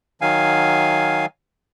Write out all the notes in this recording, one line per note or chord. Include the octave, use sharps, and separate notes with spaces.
D#3 F#3 F5 G#5